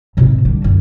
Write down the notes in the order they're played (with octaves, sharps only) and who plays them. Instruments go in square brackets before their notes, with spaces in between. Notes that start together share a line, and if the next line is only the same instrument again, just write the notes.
[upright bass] G#1 C3
D3 G3
F#2